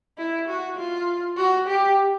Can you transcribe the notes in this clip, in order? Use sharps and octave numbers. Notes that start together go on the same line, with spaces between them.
E4
F#4
F4
F#4
G4